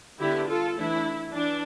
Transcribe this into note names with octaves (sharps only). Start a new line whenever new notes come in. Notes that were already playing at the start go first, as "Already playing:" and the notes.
D3 G3 B3 D4 E4 G4
F4 A4
E3 A3 D4 E4
E3 D4